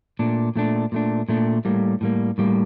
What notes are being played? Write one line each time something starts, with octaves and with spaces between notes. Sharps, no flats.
A#2 A3 D4
A#2 A3 D4
A#2 A3 D4
A#2 A3 D4
A2 G3 A#3
A2 G3 A#3
A2 G3 A#3